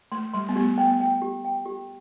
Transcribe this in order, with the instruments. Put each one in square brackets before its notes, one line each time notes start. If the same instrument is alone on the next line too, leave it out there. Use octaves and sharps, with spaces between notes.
[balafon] A3 [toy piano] C6
[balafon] G3 [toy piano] C6
[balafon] B3
[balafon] A3 [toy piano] G4
[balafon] B3 [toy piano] G5
[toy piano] G5
G4
G5
G4